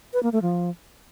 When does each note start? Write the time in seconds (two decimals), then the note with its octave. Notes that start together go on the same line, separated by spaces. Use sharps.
0.13 B4
0.23 A#3
0.33 A3
0.42 F3